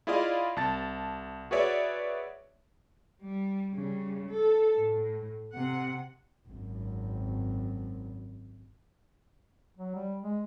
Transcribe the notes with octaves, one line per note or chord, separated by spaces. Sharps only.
E4 F4 G#4 D5 D#5 F5
C2 A5 A6
F#4 G#4 B4 C#5 D5 E5
G3
C#3 G3
A4
A2
C3 F#5
G#1 F#2
F#3
G3
G#3